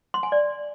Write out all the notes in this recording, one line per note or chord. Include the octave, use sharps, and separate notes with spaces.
C6
G#5
D5